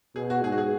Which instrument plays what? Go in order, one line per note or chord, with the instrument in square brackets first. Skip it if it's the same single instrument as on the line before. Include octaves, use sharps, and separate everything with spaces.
[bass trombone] B2 [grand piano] G#4
[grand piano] F#4
[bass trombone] G#2 [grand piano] G#4
[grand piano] F#4
G#4